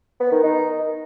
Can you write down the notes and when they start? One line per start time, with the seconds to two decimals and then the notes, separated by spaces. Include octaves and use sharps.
0.20 B3
0.32 D#3
0.43 D#4